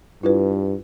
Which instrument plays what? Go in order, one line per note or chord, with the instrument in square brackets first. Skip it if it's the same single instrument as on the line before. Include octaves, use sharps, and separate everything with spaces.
[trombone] G2 [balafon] E4 F4 B4